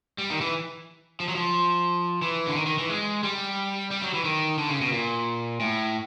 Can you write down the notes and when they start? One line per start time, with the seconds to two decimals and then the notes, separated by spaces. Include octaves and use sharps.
0.18 G3
0.30 D#3
0.41 E3
1.20 F3
1.28 F#3
1.35 F3
2.22 E3
2.47 D3
2.56 D#3
2.66 D#3
2.78 E3
2.90 G#3
3.23 G3
3.91 G3
4.02 F#3
4.14 E3
4.25 D#3
4.58 D3
4.70 C#3
4.81 B2
4.92 A#2
5.60 A2